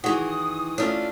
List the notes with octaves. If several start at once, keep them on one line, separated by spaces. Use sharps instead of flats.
D#3 E3 F#4 G#4 D#6
A3 C#4 D4 F4